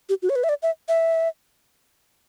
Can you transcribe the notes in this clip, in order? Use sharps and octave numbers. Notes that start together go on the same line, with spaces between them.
G4
F#4
C#5
B4
E5
D5
E5
E5